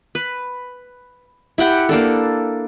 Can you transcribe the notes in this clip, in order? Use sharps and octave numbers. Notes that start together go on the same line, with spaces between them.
B4
E4 G4 F#5 G5
A#3 D4 A4